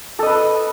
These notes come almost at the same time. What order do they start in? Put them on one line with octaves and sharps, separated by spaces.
A4 D#5 B4